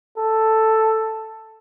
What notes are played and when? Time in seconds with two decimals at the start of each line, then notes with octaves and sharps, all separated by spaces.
0.18 A4